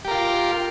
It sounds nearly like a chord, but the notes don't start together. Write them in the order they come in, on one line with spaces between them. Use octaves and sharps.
G4 A#4 F4